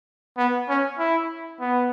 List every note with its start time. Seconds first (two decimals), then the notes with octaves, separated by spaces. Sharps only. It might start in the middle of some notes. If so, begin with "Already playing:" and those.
0.38 B3
0.68 C#4
0.99 E4
1.60 B3